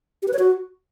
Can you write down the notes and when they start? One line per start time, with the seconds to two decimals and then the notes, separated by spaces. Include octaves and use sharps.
0.22 G4
0.28 B4
0.33 C#5
0.39 F#4